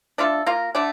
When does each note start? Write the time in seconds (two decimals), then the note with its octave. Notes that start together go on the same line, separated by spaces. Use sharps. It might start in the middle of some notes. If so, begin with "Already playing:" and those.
0.18 A3 D4 F4 A4
0.46 A#3 F4 A#4
0.75 D3 A3 D4